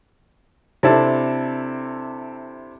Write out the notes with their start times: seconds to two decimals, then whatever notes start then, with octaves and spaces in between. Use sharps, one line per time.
0.83 C3 C4 D4 E4 A4 A5